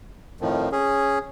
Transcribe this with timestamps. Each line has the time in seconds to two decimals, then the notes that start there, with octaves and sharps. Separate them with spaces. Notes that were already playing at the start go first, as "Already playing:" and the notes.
0.41 F2 A2 D#3 F3
0.72 C#4 G#4